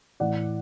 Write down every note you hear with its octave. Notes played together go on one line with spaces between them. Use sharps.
A2 E3 D5 F#5